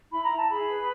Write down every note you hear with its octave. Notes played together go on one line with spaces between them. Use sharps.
E4 B5
A#5
E4
A5
G#4 B5
B4